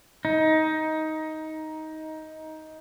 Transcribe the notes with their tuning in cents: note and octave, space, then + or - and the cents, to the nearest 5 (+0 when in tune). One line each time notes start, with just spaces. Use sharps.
D#4 +15